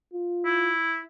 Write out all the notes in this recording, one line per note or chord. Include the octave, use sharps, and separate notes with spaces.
F4
E4